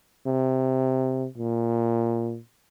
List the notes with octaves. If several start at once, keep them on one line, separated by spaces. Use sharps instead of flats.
C3
A#2